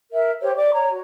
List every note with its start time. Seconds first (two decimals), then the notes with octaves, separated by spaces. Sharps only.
0.12 A#4 E5
0.41 G4 C5 C#5
0.56 D5 D6
0.72 C#5 A#5
0.88 F#4